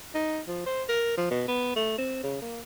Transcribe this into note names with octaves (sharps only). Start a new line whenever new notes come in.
D#4
F3
C5
A#4
F3
B2
B3
A3
C4
C#3
A#3